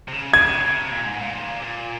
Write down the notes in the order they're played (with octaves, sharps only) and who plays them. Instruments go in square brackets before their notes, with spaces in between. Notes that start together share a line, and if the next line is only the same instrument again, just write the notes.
[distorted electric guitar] C3
C#3
[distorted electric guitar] C#3 [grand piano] G#6
[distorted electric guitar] D#3
C3
C#3
C3
A#2
G#2
A#2
F3
D#3
C#3
C3
A#2